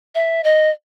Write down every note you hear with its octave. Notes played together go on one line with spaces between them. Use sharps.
E5
D#5